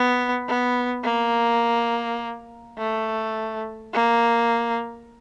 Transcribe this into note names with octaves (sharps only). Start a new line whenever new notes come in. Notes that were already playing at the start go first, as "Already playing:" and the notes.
Already playing: B3
B3
A#3
A3
A#3